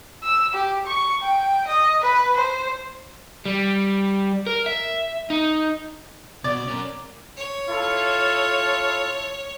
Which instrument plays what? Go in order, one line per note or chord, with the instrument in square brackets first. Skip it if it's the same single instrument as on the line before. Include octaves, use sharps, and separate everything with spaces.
[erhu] E6
G4
C#6
G5
D#5
B4
C5
[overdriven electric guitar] G3
A#4
E5
D#4
[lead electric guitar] B2 [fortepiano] D5
[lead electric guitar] C#4 A#4
[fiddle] C#5
[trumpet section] E4 F4 A4